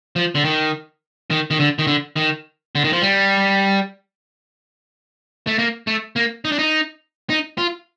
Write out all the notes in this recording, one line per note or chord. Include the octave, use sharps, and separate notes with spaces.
F3
D3
D#3
D#3
D#3
D3
D#3
D3
D#3
D3
D#3
F3
G3
A3
A#3
A3
A#3
D#4
D4
D#4
D#4
F4